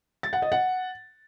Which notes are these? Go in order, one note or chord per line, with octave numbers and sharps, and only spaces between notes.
A6
F#5
D#5
F#5